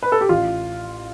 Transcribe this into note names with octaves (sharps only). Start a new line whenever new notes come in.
B4
A4
G4
A1 F4